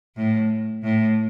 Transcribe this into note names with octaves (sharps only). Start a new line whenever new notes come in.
A2
A2